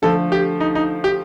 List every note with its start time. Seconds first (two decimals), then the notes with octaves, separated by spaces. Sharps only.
0.02 D3 F3 A3 A4
0.32 G4
0.60 D#4
0.75 D#4
1.04 G4